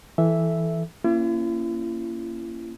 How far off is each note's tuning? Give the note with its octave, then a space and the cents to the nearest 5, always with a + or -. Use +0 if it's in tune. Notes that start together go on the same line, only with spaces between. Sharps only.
E3 +0 A4 -10 E5 +0
A#3 +0 C#4 +0 E4 +45